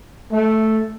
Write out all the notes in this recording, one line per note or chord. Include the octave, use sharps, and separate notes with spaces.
A3